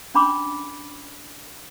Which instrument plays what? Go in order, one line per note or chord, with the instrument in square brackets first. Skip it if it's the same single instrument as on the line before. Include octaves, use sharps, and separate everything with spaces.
[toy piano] C#4 D4 B5 C6 D6